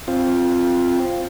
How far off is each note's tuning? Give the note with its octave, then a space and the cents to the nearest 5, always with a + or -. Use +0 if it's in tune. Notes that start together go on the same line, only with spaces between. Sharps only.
C4 +5 F4 +0